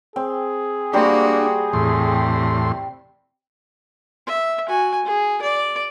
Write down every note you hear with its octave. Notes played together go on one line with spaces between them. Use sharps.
C4 G#4
G3 A#3 D4 F#4 C5 G5
E2 A2 C3 C6
E5
F#4 G#5
G#4
D5